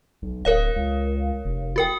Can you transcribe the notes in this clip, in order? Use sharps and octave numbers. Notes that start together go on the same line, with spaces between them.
B1
D1 A#4 C#5 F5
C#2
F1
F#4 A#4 G5